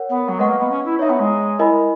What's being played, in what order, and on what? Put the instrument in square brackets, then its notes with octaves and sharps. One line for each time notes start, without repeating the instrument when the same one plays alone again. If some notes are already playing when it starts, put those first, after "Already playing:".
Already playing: [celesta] A#4 C#5 F#5
[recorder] B3
F#3
[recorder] G#3 [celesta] B4 D#5 F#5 C#6
[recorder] A#3
B3
C#4
E4
[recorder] D#4 [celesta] C#5 E5 A#5
[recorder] B3
G#3
[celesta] E4 A#4 D#5 G#5 B5